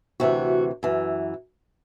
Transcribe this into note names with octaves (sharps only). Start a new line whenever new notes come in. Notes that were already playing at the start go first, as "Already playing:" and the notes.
D2 C3 E3 F#4
F#2 E3